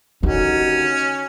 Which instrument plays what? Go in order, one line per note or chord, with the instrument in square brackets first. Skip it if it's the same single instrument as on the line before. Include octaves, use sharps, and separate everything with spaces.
[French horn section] D#2 D#4 F#4 [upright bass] D3 [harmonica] C#4